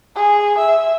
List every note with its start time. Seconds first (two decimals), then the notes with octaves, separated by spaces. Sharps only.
0.15 G#4
0.58 E5